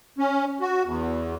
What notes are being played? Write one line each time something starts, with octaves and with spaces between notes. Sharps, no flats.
C#4
F#4
E2